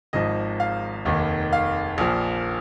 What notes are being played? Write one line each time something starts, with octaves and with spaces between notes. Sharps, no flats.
G#1 G#2 F3 D#5
F5
F1 D#2 D#3
F5
A#1 A#2 F3